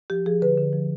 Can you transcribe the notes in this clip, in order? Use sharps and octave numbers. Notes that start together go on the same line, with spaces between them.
F3 G4
F3 G#4
D3 B4
D3
F3